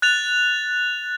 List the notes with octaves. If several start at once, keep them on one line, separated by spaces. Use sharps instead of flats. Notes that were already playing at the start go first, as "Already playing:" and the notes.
F#6 A6 F7